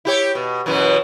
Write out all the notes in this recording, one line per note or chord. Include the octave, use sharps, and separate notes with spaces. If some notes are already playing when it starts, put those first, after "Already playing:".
E4 G4 C#5
B2
F#2 B2 E3